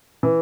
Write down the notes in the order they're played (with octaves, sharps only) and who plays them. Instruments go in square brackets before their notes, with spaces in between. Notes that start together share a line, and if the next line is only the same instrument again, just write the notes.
[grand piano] E3